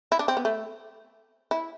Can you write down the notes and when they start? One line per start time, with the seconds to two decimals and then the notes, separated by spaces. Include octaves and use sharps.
0.12 E4
0.19 D4
0.28 C4
0.37 B3
0.45 A3
1.51 E4